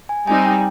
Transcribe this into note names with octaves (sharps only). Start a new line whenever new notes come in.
G#5
G3 C4 D#4 G#5
G5